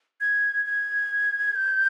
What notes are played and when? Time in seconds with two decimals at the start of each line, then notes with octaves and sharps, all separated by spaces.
0.21 G#6
0.66 G#6
1.55 G6